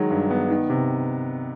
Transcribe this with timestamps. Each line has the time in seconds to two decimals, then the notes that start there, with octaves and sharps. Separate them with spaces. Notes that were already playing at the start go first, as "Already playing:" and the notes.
Already playing: D#3 F#3 G#3
0.10 G2
0.30 B3
0.50 D#3
0.70 C3